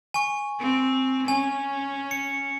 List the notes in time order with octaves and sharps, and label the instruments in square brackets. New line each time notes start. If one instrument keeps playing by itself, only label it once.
[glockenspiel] G#5 C#6
[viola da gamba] C4
[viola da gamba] C#4 [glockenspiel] G#5
[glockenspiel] C#7